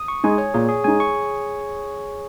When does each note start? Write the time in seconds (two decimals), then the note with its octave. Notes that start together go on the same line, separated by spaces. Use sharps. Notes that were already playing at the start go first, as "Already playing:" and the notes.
Already playing: D#6
0.08 C#6
0.24 G#3 D#4 G#5
0.38 C#5
0.54 A#2 G#4
0.69 G#4
0.84 G#3 D#4 G#5
1.00 C#6